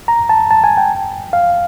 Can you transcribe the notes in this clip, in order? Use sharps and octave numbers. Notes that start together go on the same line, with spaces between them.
A#5
A5
A5
G#5
G5
F5